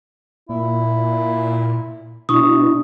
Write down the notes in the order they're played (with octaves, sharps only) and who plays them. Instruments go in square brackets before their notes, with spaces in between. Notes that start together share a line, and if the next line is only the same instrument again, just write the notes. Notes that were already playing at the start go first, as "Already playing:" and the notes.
[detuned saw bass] A#2 [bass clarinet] E4
[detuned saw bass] B2 [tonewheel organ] D4 E4 [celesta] C#6 D#6